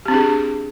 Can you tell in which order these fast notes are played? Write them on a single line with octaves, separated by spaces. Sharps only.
G4 C4 D4 G#4